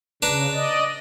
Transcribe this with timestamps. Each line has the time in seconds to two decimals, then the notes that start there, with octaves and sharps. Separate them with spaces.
0.22 C#3 D4 B4 A#5
0.53 D5 D#5